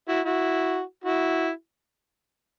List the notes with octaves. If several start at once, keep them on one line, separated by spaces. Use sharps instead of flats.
E4 F#4
E4 F#4
E4 F#4